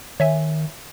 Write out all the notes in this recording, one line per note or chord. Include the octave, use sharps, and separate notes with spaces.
D#3 C#5 E5 G#5